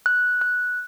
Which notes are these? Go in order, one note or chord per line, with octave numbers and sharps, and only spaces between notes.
F#6
F#6